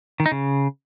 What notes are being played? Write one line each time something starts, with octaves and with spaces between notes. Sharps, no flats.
D#3
D#4
C#3